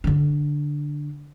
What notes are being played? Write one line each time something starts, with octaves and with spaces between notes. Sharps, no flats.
D3 D4